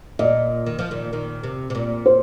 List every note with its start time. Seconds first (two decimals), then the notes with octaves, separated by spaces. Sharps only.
0.19 A#2 D#5
0.67 D#3
0.79 F3
0.91 A#2 D#3
1.13 A#2 D#3
1.44 C3
1.70 C3
1.75 A#2
2.06 C5